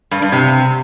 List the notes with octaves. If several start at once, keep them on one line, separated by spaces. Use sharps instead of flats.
G2
G2
C3